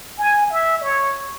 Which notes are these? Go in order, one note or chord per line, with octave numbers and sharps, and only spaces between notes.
G#5
E5
C#5